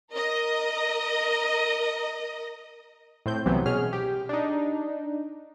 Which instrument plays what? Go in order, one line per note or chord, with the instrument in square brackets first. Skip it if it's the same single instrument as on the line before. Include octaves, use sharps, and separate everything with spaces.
[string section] A#4 D#5
[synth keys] A2 C4 G6
C2 C3 E3 F#3 B3
B2 C#4 G#4 F6
G4
D4 D#4